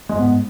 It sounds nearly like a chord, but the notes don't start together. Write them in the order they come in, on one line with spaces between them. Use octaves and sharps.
G#3 G#2 B3